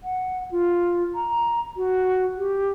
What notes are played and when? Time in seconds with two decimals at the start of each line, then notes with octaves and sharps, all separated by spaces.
0.03 F#5
0.51 F4
1.15 A#5
1.77 F#4
2.37 G4